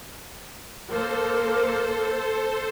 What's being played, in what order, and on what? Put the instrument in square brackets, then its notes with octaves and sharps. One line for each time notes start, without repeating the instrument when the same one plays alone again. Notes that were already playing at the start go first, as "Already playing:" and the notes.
[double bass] A#3 [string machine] A4 C5